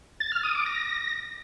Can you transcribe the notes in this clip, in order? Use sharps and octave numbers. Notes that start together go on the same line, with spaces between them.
A6
F6
D#6
D6
A#6